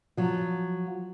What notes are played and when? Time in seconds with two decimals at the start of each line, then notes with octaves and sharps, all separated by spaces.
0.17 F3 F#3